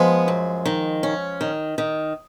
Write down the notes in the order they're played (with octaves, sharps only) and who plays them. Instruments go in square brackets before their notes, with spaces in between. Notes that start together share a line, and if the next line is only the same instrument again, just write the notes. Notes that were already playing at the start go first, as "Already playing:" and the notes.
Already playing: [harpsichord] F3 G#3 [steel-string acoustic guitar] B3
[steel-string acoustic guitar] F#2
D#3
C#4
D#3
D#3